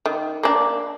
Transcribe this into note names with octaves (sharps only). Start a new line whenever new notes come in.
D#3
A#3 D4